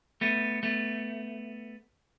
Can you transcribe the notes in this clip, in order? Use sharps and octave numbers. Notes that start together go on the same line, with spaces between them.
A3 B3
A3 B3